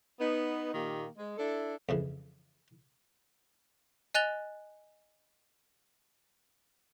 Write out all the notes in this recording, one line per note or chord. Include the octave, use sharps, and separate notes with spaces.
B3 D#4
A#2 D#3 A#3 G4
G#3
D4 E4 A4
F2 C#3 E3
D#5 G#5 F#6 A6 F7 G7